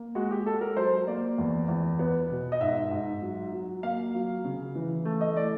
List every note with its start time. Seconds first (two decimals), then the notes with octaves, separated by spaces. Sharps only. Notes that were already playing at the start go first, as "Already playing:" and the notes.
Already playing: A#3
0.15 G#3 F#4
0.31 G4
0.46 G#3 A4
0.61 A#4
0.77 F#3 C5
1.07 A#3 D5
1.38 E2
1.68 E2
1.99 B3
2.30 B2
2.52 D#5
2.61 G#2 E5
2.91 G#2
3.22 F#3
3.53 F#3
3.83 A#3 F5
4.14 F#3
4.45 C#3
4.75 E3
5.05 A3
5.21 D#5
5.36 A3 D5